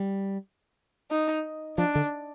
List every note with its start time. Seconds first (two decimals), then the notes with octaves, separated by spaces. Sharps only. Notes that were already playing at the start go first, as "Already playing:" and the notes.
Already playing: G3
1.11 D#4
1.78 F3 D4
1.95 D3